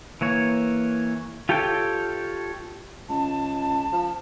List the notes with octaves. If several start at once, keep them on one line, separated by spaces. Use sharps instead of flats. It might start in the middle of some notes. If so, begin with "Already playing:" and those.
E3 A#3 C#5
F4 G4 A4 C#5 G5
C#2 A5
F3